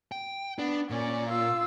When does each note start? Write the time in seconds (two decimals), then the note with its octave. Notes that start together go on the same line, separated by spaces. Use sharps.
0.12 G5
0.59 B3 D4
0.90 A#2 C#4 D5
1.28 F4 E6